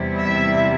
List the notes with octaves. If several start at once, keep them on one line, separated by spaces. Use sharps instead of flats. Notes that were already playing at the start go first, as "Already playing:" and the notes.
Already playing: E2 C3 G3 E4
E5